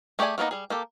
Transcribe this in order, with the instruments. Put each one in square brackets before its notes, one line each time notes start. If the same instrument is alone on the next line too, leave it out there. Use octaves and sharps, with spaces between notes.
[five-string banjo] A3 G4 G#4 D5 G#5
D#3 A#3 B3 D#4 A#5
G3 G#4
A#3 G4 A4